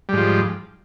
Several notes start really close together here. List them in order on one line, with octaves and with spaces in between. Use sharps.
G3 G#2 F3